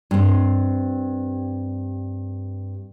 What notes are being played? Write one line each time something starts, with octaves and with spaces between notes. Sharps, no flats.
G2 C4